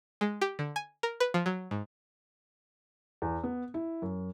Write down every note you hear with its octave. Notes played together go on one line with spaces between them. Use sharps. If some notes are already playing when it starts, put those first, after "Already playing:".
G#3
G4
D3
G#5
A#4
B4
F3
F#3
G#2
E2
B3
E4
F#2